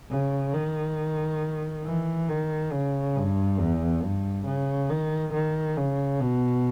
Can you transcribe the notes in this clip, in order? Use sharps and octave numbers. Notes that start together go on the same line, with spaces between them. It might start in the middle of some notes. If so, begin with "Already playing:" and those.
C#3
D#3
E3
D#3
C#3
G2
E2
G2
C#3
D#3
D#3
C#3
B2